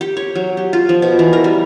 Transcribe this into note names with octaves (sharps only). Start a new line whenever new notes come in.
G4
C#5
F#3
G4
F4
F3
B2
E3
A#4
G3